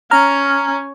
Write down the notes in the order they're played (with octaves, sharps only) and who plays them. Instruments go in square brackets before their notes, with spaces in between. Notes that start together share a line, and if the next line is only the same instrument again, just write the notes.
[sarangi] C#4 [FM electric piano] A#5 F6